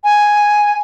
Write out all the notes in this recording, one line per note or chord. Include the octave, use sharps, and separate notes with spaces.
G#5